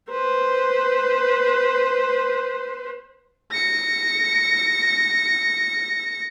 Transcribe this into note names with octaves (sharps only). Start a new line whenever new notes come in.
B4 C5
A#6 C#7